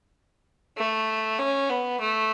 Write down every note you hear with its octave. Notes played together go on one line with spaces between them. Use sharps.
A3
C#4
B3
A3